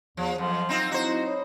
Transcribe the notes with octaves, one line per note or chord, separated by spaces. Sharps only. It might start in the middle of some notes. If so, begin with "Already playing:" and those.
E2 F3
F2 F3 F#3
C4 D#4 F4
C4 D#4 E4 F#4 C5
C#5 B5 D#6